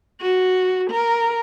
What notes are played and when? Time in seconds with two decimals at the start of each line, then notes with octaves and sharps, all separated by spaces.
0.21 F#4
0.90 A#4